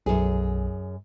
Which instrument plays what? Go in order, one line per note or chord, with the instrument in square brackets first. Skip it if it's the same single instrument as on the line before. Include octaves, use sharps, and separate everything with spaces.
[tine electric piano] B1 [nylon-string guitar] F#2 G#4